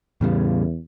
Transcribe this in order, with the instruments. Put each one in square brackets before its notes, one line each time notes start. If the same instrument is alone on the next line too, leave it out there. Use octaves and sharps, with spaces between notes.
[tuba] E2 [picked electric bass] A2 C#3 G3